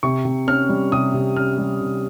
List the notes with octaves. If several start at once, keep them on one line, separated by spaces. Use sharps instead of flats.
C3 C#6
C3
C#4 F6
G3
C3 D#6
C3
C#4 F6
G3
C3